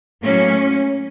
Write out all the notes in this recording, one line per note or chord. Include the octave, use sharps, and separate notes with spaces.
A2 F#3 A#3 C#4